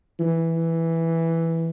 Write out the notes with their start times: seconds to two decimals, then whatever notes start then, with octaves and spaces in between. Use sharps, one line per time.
0.20 E3